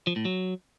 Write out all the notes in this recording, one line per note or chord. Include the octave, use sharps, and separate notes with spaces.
F3
A2
F#3